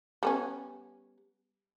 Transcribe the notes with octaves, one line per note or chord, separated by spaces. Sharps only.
G3 B3 C#4